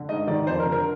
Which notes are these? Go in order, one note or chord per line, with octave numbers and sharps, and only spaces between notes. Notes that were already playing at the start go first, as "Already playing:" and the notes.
Already playing: D3
G#2 D#5
D#3 D5
F2 C5
A#4
D3
A#4